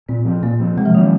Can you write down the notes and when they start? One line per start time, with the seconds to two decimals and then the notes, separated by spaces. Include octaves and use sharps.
0.09 A#2 C4
0.25 F3 C4
0.42 A#2 A#3
0.60 F3 C4
0.77 C3 G#3
0.86 F3
0.94 D#3 F#3 A#3 C#4